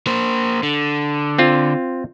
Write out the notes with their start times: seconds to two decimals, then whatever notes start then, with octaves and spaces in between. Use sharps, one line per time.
0.07 A#3 C5
0.63 D3
1.38 C4 F4